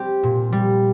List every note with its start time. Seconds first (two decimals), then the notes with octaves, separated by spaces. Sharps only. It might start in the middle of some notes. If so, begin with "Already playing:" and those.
Already playing: G3 C4 G4
0.23 A#2
0.52 G3